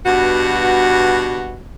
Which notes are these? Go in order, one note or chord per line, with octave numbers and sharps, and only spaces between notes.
G2 B2 F#4